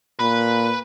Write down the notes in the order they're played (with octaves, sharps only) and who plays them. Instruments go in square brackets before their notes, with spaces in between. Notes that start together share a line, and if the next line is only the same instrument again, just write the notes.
[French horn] A#2 [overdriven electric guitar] B4